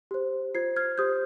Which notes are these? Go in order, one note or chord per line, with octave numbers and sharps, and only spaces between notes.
G4 C5
F4 C5 G#6 C7
F6 G#6
G4 C5 D#6 G6